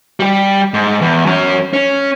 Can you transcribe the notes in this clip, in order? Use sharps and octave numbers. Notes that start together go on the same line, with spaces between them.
G3 G4
G#2
E2
F#2 C#4
C#4